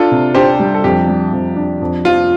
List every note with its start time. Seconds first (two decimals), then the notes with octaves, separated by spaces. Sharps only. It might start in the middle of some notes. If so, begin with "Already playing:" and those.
Already playing: D4 F4 A4
0.11 C3
0.34 D4 G4 C5
0.59 G3
0.74 A4
0.84 F2 G4
1.08 G3
1.33 F2
1.56 D4
1.81 F2
2.05 F3 F4